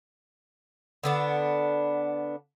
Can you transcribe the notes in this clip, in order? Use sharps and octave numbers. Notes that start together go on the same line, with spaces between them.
D3 B3 D4